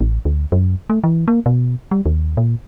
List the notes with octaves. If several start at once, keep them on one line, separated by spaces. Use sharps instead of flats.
A1
D2
F#2
A3
E3
A#3
B2
G3
D#2
A#2